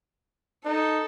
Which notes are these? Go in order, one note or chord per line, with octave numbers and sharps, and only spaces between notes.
D#4 A4